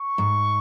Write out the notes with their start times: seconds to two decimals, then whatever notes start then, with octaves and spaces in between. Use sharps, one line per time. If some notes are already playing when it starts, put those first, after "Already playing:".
Already playing: C#6
0.18 G#2